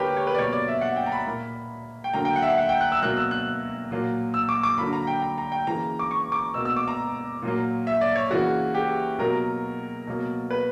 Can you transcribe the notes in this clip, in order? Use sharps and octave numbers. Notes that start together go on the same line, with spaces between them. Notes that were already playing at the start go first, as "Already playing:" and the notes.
Already playing: D3 A#3 G4 A#4 B4 C#5
C#5
B4
D5
B2 F#3 A#3 C#5
D5
E5
F#5
G5
A#5
B5
A#2 A#3
G5
D3 F#3 A#3 A#5
G5
F#5
E5
F#5
F#5
G5
F#6
E6
B2 F#3 A#3 F#6
E6
F#6
A#2 F#3 A#3
E6
D6
D6
D3 F#3 A#3 B5
A#5
G5
A#5
A#5
G5
C#3 E3 A#3 A#5
D6
C#6
D6
B2 A#3 E6
E6
D6
A#5
A#2 F#3 A#3
E5
D5
C#5
C#3 E3 A#3 F#4
G4
B2 F#3 A#3 A#4
B2 F#3 A#3
B4